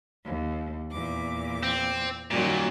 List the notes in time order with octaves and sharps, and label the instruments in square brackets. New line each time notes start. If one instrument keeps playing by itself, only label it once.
[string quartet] D#2
E2 A#2 D6
[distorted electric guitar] C4
[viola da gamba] F#2 G3 [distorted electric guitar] A#2 [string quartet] D#3 F#3